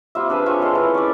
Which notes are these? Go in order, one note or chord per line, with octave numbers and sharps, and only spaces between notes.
G3 C4 F4 E5
D4 G#4 B4
C4 F4 A4 C#5
G#3 A4 C6
E4 B4
C#4 D5